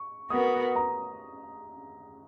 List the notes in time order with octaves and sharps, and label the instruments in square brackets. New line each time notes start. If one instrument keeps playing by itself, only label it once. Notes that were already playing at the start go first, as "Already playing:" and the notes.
Already playing: [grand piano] C#6
[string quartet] B3 F#4 A#4 [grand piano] D#6
[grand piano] A#5